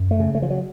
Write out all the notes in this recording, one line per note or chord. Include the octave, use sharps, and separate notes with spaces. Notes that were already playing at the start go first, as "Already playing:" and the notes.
Already playing: F#2
A3
C#3
A3
F3
F#3